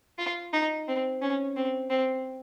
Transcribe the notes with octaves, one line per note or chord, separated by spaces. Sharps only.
F4
D#4
C4
C#4
C4
C4